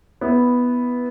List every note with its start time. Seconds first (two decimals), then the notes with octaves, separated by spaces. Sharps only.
0.21 B3 E4